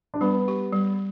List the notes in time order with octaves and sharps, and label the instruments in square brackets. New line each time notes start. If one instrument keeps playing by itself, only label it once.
[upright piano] D4
[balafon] G3 [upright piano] B3
[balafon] G4
G3